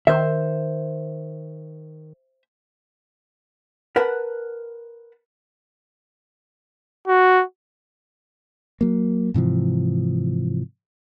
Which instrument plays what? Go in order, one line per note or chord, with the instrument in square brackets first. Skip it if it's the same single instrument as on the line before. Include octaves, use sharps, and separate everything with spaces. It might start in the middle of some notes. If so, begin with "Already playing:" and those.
[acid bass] D#3 [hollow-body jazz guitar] C5 E5
[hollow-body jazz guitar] A#4 B4 F#5 A5 B5
[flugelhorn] F#4
[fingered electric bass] F#3 A#3
G#2 C3 E3 F3